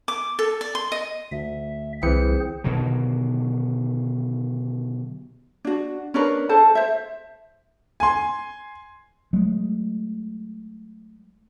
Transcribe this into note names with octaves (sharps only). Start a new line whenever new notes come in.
D6
A4
D5
C6
D#5
D2 E5
C2 E3 C4 G#4 C5 C#7
B2 D3 D#3 F#3
D4 F#4
C#4 D4 A#4 B4
A4 C5 A5
C5 E5
G#5 C6
F#3 G#3 A3